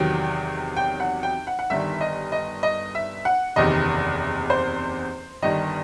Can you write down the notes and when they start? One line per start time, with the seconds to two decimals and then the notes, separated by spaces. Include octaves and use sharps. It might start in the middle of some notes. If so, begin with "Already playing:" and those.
Already playing: E2 C3 D#3 F#3 G5
0.77 G5
1.00 F#5
1.23 G5
1.47 F#5
1.59 F#5
1.70 G1 G2 D#3 E5
2.01 D#5
2.32 D#5
2.63 D#5
2.95 E5
3.25 F#5
3.56 F#1 E2 C3 D#3 D#5
4.50 C5
5.42 G1 G2 D#3 D#5